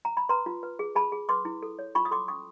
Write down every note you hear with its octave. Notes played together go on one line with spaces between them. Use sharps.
A#5
B5
B4 A#5 C6
F4
B4
G#4
G#4 A5 B5
G#4
B4 C6 D6
E4
A4
C#5
F4 B5 C#6
D#6
A4 C6 D6
C#4 C#6 D#6